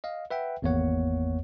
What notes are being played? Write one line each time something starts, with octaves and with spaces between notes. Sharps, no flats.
D#5 F5
B4 E5 F#5 G5
G#1 E2 A#3 B3 C#5 F#5